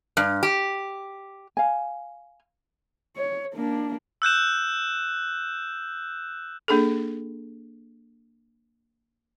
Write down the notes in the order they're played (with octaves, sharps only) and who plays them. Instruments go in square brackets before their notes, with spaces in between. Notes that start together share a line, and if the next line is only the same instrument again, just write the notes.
[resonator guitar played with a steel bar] G2
G4
[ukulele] F5 G#5
[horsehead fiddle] C#5
A#3 D4
[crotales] E6 F#6 G6 E7
[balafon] A#3 D4 G#4 A4